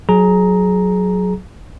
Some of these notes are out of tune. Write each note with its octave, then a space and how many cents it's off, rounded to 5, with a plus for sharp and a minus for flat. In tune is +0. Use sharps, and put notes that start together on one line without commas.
F#3 +0 G#4 +25 A#5 +0